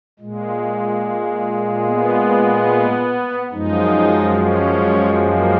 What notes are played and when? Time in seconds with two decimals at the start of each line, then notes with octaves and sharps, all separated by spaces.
0.19 A#2 G#3
1.86 B3
3.52 F#2 F3 G#3 D#4
4.35 C#4
5.18 A#3